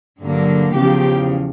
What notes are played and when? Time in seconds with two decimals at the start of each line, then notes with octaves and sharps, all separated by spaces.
0.22 G2 D3 F#3 A#3
0.75 E2 C#3 F3 G4